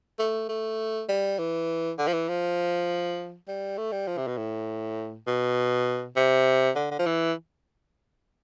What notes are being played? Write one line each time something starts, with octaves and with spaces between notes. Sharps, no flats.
A3
A3
G3
E3
D3
F3
E3
F3
G3
A3
G3
F3
C3
B2
A2
B2
C3
D3
D3
F3
E3